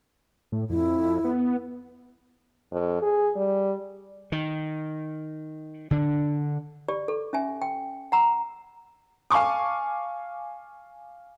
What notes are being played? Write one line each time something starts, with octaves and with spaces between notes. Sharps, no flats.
A2
F2 E4
B3
F2
G#4
G3
D#3
D3 D4
G4 D5
A4
C#4 E5 G#5
G5
F#5 A#5 E6
F5 G#5 A5 C#6 D6